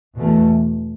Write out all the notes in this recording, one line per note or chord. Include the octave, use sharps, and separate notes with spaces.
E2 B2 A3